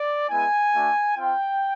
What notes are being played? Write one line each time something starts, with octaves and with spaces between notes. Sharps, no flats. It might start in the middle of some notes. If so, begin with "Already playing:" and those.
Already playing: D5
G#3 B3 E4 G#5
A3 D4 F#4
C4 F4 G5